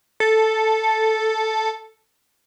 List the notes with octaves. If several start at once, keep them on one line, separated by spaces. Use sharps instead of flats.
A4